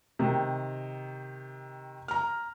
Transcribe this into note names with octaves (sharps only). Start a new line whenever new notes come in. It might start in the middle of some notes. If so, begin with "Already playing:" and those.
C3 D#3
A#5 F6